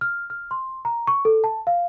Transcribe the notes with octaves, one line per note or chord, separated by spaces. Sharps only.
F6
F6
C6
A#5
C#6
A4
A5
F5